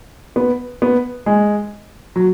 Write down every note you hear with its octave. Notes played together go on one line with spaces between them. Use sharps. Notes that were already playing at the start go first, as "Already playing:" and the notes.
B3
B3
G#3
F#3